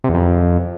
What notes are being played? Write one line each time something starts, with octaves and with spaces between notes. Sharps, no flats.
C3
E2
F2